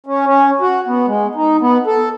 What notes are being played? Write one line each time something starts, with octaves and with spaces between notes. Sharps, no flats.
C#4
C#4
F#4
B3
G#3
D#4
B3
A4